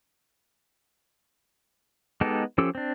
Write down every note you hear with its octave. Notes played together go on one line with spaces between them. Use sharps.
G#3 B3 D#4 G4 A4
F3 C#4 G4 A4 E6
C4 D4